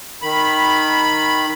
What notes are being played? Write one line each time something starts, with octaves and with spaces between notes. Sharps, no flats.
D#3 B5